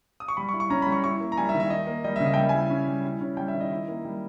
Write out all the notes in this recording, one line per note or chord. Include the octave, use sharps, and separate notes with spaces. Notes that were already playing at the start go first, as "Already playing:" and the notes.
D#6
C#6
G3 B5
C#6
E4
C#6
C#4 A#5
G3 B5
C#6
E4 C#6
A#3
A#5
G3 G#5
E5
D#3
E5
D#4 D#5
A#3
G3 D#5
C#3 E5
D#5
G5
G3 E5
E4 G#5
C#4
G3
E4
C#4
G3 G5
E5
D#3
D#5
E4
A#3
G3